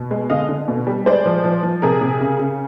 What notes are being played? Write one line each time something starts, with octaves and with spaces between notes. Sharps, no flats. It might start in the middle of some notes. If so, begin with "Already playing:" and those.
Already playing: B2
G#3
D3 D#5 F5
D3
B2
G3
G#3 C5 D5
F3
F3
F3
C3 G#4 A#4
C3
C#3
C#3